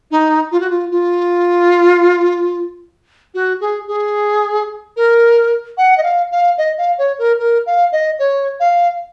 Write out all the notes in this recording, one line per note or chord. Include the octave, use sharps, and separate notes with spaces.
D#4
F4
F#4
F4
F4
F#4
G#4
G#4
A#4
F#5
D#5
F5
F5
D#5
F5
C#5
A#4
A#4
F5
D#5
C#5
F5